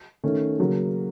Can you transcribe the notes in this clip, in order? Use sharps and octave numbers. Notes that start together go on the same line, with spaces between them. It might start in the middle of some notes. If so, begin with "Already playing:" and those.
D#3 A3 C#4
C#3 F#3 A#3